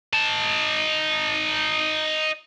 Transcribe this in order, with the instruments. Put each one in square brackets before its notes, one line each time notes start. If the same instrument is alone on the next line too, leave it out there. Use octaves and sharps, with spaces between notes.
[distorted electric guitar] D#4 A5